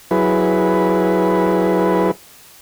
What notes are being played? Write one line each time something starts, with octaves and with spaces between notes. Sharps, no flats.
F#3 E4 G#4 B4